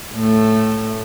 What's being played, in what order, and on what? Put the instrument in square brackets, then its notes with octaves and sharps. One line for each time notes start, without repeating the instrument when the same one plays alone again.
[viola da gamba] A2 A3